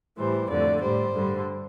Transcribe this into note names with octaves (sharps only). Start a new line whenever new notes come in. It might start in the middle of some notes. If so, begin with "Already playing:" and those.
A2 E3 G3 C5
F2 D3 A3 D5
A2 G3 C5
G2 D3 G3